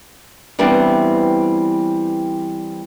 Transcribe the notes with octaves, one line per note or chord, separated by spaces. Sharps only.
E3 G3 B3 C4 D4 E4